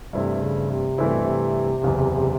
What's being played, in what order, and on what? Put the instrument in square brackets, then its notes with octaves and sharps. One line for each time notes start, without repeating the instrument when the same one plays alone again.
[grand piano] G2 E3 A3 C4 E4 [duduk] C3
[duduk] C3
C#3
C3
[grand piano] G2 E3 A3 C4 E4 [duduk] C#3
[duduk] C3
B2
C3
[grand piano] F#1 E2 C#3